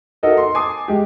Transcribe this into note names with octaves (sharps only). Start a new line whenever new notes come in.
D#4 F#4 A4 A#4 D#5 E5
C6
G#5 A5 D6 D#6 C7
G#3 G4